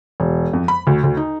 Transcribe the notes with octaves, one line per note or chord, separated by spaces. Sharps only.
E1
F2
B5
D2
D2
D#4